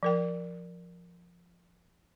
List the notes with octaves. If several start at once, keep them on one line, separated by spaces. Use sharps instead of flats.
F3 A#4 G5